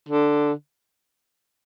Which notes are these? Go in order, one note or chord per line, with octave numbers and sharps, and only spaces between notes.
D3